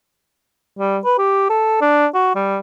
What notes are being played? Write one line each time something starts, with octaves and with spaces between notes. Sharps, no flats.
G3
B4
G4
A4
D4
F#4
G3